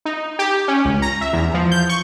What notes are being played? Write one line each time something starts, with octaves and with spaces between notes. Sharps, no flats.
D#4
G4
C#4
C#2
A#5
E5
E2
F3
G6
C#6